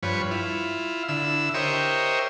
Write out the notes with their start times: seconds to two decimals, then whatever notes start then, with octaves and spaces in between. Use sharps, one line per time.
0.03 G2 F3 B4 C#5
0.31 E4 F4
1.08 D3 E4 E6
1.54 G4 A#4 C5 C#5 D#5 E5